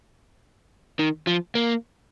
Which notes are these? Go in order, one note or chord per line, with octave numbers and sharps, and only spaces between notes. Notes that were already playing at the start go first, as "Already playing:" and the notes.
D#3
F3
A#3